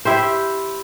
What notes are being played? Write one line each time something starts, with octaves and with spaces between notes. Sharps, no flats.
E4 G4 C5